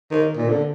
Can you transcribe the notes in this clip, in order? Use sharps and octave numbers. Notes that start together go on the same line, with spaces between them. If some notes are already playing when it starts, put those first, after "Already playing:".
D#3
A#2
D3